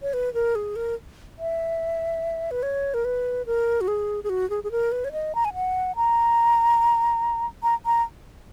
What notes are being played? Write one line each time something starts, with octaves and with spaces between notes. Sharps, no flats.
C#5
B4
A#4
G#4
A#4
E5
B4
C#5
A#4
B4
A#4
F#4
G#4
G#4
F#4
G#4
G#4
A#4
B4
C#5
D#5
A#5
G#5
F#5
A#5
A#5
A#5